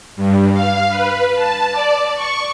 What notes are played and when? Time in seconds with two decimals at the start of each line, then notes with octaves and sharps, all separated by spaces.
0.16 G2
0.53 F5
0.89 B4
1.36 A5
1.72 D5
2.15 C#6